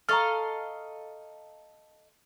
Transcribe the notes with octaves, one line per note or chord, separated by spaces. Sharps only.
A4 D#5 F5 A#5 C#6 F6